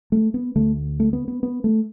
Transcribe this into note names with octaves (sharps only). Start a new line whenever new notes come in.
A3
B3
D2 D3 A3
A3
B3
B3
B3
A3